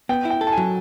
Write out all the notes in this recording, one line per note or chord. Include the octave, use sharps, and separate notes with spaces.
B3 G5
E4
G5
A4
A5
G#5
F#3